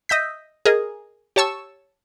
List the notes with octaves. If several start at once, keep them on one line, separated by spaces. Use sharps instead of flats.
D#5 E5 G6 B6
G#4 A#4 D#5
G4 C#5 A5 C#6 E6